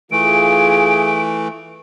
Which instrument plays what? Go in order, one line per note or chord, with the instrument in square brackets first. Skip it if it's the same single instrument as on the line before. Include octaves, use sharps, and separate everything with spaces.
[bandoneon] E3 A3 [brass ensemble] F4 G#4 [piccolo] D7